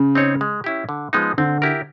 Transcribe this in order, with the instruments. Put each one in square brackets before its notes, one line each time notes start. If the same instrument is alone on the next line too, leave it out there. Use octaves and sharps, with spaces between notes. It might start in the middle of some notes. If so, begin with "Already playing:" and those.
Already playing: [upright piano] C#3
[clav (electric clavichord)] C4 D#4 G#4 C#5
G#3
C#4 E4 G4
D3
F3 G#3 B3 D#4
[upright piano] D3 [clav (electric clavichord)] C4
[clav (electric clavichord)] E4 G4 A#4